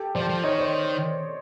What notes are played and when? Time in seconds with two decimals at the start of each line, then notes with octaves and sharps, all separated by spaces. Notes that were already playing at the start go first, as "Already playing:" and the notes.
Already playing: G4 A4
0.15 F3 C5 D5
0.29 F3
0.44 D#3 C#5 D#5
0.58 C5 D5